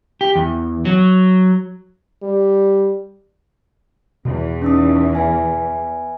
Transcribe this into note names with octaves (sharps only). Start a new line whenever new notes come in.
G4
E2
F#3
G3
E2 B2 E3
C#4 D#4 D#6
B4 E5 G#5